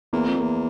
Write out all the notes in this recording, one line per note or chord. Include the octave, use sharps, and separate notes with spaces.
E2 A#3
F2
A#3
E2